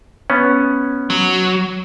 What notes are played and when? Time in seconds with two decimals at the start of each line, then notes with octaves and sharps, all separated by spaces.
0.30 B3 C#4
1.10 F#3